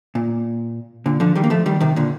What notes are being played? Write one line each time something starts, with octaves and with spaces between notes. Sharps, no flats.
A#2
A#2 D3
D3 F3
D#3 G3
A#3
F3 A3
D#3 G3
C3 D#3
A#2 D3